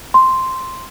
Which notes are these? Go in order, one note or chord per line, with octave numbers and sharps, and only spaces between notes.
C6